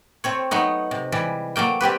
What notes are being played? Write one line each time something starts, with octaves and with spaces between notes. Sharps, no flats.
A3 C4 C#5
F#3 A3 B3 D#4
C3
E3 G3 G#3
F#3 A3 A#3 G5
G3 C4 G4 B4